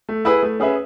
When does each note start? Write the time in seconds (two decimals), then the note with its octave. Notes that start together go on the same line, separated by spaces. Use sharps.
0.09 A3
0.25 E4 G#4 B4
0.43 A3
0.60 C#4 G#4 B4 E5